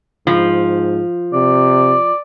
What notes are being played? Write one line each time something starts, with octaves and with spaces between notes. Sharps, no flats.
G#2 F3
C3 D5